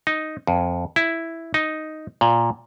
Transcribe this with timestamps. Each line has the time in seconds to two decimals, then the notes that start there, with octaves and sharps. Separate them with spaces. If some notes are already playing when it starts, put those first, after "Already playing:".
0.07 D#4
0.47 F2
0.96 E4
1.54 D#4
2.21 A#2